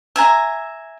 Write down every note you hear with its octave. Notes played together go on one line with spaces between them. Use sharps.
E5 G#5 A#5